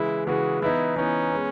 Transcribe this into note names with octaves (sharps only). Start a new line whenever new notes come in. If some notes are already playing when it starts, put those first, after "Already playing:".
Already playing: C#3 E3 G#3 E4
C#3 E3 G#3 F#4
E3 B3 D#4 E4
E3 B3 C#4 D#4
G#3 B3